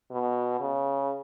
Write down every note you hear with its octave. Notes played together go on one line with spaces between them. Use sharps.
B2
C#3